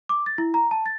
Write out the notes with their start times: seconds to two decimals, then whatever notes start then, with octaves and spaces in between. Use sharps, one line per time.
0.09 D6
0.26 A6
0.38 E4
0.54 A#5
0.71 A5
0.86 A6